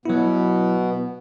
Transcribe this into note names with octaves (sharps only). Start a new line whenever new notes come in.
B2 F#3 B3 E4